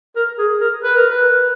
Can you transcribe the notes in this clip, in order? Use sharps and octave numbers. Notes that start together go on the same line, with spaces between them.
A#4
G#4
A#4
B4
A#4
B4